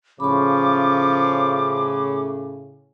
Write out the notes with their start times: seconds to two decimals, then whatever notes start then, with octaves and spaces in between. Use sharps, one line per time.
0.20 A2 C#3 F3 B5 C#6 D6